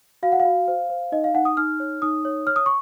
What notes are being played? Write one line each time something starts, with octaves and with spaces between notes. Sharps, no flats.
F#4 F5
F#5
F5
F#4
C5
C5
D#4 D#5
F5
D#4 F#5
D#6
D#4 F6
C#5
D#4 D#6
C#5
C#5 F6
D#6
C#6